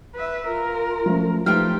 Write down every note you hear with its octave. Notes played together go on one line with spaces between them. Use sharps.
B4 E5
F4 A#4
F3 A3 C#4
F3 A3 D#4 F4 G4 B4 G5 F6